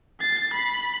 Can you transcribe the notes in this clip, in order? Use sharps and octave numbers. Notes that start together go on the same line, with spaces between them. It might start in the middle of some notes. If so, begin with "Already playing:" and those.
A6 C7
B5